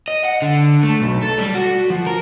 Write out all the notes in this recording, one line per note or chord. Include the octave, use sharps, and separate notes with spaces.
D#5
F#5
D3
A3
B1
A4
G3
F#4
F3
A#4